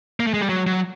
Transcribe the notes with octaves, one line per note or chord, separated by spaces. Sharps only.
A#3
A3
G#3
G3
F#3
F#3